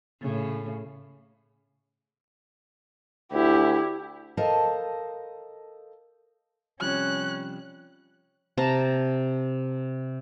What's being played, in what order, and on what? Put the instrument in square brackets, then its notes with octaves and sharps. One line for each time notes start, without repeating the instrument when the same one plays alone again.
[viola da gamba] A2 C#3
[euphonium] D2 [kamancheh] E4 G4
[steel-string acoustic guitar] A4 A#4 C5 D#5 F5 A5
[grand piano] C3 F3 G3 [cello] C#4 [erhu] F#6
[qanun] C3 A5 A#5